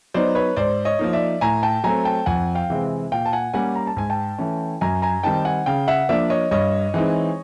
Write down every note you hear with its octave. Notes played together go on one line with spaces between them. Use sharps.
F#3 B3 D#4 C5 D5
B4 C#5
G#2 C5 D5
C#5 D#5
F3 A#3 D#4
D5 E5
A2 G#5 A#5
G5 A5
F#3 A3 C4 G#5 A#5
G5 A5
F2 F#5 G#5
F5 G5
C3 E3 G#3 C4
A#2 F5 G5
A5
F#5 G#5
G3 A#3 C#4 F#5 G#5
A#5
A5
G#2 G#5
G5 A5
E3 A3 C#4
F#2 G#5 A#5
G#5 A#5
D#3 G3 C4 D#4 G5 A5
F#5 G#5
C#3 F5 G5
E5 F#5
F3 A#3 D4 D5 E5
C#5 D#5
G2 C#5 D#5
E3 G#3 C4 D#4